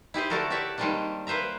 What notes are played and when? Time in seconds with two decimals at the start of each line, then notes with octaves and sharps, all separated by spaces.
0.14 E4 G4 G#4 C5
0.30 D3 A3 D4 F#4 A4 A#4
0.50 F#4 G4 C#5 D5 E5
0.78 D#3 G3 G#3 A#3 C4 D4
1.27 A#3 B4 C5 E5 A#5